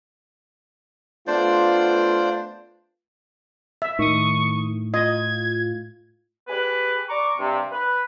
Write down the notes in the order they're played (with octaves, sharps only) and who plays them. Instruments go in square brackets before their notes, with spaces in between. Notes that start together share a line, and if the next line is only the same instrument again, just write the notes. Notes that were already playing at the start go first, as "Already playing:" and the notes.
[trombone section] A3 B3 F4 [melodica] D4 C5 D5
[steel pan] E5
[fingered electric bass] A2 [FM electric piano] D#3 D#6 [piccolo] C#6
[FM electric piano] F4 [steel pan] D#5 [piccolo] G#6
[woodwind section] G4 G#4 B4
D5 A#5 C#6 D6
G2 C3
B4